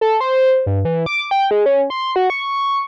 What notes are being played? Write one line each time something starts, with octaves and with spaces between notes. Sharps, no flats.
A4
C5
G2
E3
D6
G5
G#3
C#4
C6
F#4
C#6